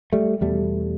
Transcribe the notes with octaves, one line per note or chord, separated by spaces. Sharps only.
G3 A3
E2 B2 G3 A3